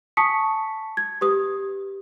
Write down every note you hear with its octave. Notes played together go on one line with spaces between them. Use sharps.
G#5 A5 C#6 D#6 B6 C#7
G#6
G4 B4 D#6